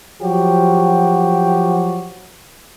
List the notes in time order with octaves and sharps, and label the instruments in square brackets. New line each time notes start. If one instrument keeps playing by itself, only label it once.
[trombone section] F3 F#3 F#4 G4